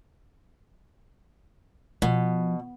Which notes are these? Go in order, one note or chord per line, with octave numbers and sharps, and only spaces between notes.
B2 F3